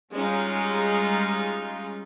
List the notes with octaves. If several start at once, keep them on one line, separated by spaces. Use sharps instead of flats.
G3 G#3 C#4 D#4 F4